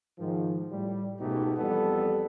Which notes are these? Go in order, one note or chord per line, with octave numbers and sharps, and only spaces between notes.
G#2 D#3 F3
A2 G3
C#2 G#2 B2 A3 D#4 G4
F2 E3 G3 B3 A4